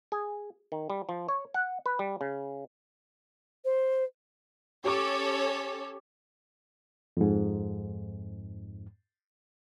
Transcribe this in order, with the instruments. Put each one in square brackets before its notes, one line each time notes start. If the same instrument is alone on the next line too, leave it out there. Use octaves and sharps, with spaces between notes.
[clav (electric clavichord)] G#4
D#3
G3
F3
C#5
F#5
B4
G3
C#3
[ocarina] C5
[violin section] C#4 A4 C#5 [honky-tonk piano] G4 C#6 D6
[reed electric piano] F2 G#2